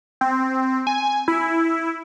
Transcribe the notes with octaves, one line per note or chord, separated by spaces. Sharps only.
C4
G#5
E4